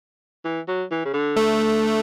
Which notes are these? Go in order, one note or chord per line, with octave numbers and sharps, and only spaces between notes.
E3
F#3
E3
C#3
D3
A3